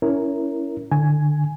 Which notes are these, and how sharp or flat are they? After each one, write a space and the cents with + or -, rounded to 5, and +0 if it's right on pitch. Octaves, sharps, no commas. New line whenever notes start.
C#4 +15 E4 +0 A#4 +0
D3 +20 G#5 +5